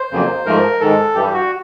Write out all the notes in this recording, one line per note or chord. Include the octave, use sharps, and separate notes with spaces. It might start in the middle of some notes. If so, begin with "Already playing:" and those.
Already playing: C5
F2 C#3 F#3 A#3
G#2 F3 A3 A#4
G#2 D#3 G#3 A4
G2 E3 G3 G4
F#4